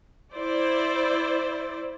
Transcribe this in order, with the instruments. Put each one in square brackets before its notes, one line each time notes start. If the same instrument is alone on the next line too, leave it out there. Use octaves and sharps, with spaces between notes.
[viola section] E4 C5 D5